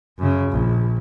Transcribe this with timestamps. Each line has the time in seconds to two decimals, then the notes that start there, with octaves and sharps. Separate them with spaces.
0.18 F#2 C#3
0.50 A#1